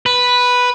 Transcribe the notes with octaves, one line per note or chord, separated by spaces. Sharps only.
B4